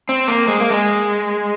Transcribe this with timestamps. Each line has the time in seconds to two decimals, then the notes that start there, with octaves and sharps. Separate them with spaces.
0.09 C4
0.28 A#3
0.48 G#3
0.60 A#3
0.70 G#3